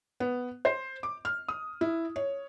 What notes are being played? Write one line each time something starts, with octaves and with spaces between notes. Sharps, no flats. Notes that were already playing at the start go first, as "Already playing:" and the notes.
B3
C5
D6
F6
D#6
E4
C#5